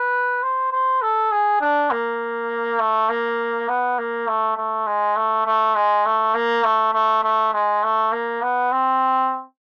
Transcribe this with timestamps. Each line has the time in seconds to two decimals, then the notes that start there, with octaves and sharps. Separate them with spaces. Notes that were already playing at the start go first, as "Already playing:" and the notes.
Already playing: B4
0.43 C5
0.72 C5
1.02 A4
1.31 G#4
1.61 D4
1.91 A#3
2.79 A3
3.09 A#3
3.68 B3
3.98 A#3
4.28 A3
4.57 A3
4.87 G#3
5.16 A3
5.46 A3
5.75 G#3
6.06 A3
6.35 A#3
6.64 A3
6.94 A3
7.23 A3
7.53 G#3
7.83 A3
8.12 A#3
8.42 B3
8.72 C4